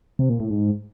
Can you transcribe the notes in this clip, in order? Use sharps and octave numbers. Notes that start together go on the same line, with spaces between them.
C3
A#2
A2
G#2